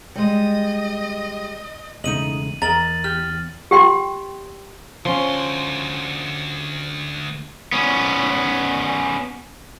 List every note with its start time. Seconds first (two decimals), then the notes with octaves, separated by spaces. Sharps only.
0.15 G3 G#3 D#5
2.04 E1 C#3 A3 D#4 D#5 D#7 F#7
2.62 E2 A#4 D#5 A#5 A6 F#7
3.04 G4 F6
3.71 G4 G5 C6
5.05 D2 F3 C#4 C6
7.73 B3 C#4